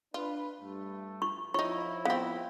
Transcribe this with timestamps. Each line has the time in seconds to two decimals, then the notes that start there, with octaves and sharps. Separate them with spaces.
0.14 D4 F4 B4
0.61 G2 A3
1.22 C#6
1.54 F3 D#4 E4 C#5 C#6
2.05 B3 C4 F5